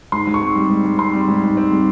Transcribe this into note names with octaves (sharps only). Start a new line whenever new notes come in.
G#2 C6
G#2
C#6
C4
G3
G#2
G#2
C4 C6
G3
G#2
G#2
C4
G3